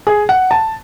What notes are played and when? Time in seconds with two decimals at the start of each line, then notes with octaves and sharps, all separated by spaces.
0.07 G#4
0.29 F#5
0.51 A5